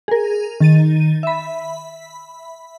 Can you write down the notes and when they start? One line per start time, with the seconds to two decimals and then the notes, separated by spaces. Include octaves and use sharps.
0.08 G#4 A#4
0.60 D#3 A6 D#7
1.23 E5 B5